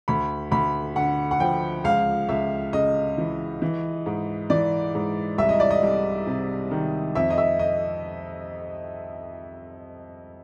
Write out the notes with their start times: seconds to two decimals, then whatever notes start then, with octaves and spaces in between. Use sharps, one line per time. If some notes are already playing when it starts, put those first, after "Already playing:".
0.08 D2 B5
0.51 D2 B5
0.96 D3 F#5
1.31 F#5
1.40 F3 G5
1.84 C#2 F5
2.29 C#2 E5
2.73 C#3 D#5
3.18 E3
3.62 E3
4.06 G#2
4.50 E3 D5
4.95 G#2
5.38 C2 E5
5.49 D#5
5.60 D5
5.71 D#5
5.83 C2
6.27 C3
6.71 D#3
7.15 F2 E5
7.30 D#5
7.38 E5
7.59 D#5